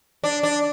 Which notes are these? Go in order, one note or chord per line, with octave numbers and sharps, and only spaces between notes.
D4
D4